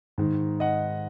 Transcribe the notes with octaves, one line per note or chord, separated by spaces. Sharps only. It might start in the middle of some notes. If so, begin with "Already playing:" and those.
G#2 D#3
D#5 F#5